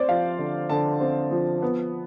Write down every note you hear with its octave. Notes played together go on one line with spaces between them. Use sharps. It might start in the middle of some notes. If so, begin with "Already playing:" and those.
Already playing: C4 C5 D5
F3 F5
D3
D3 A5
C4
F3
B3